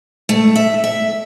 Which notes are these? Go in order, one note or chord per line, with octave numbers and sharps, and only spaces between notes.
A3
E5
E5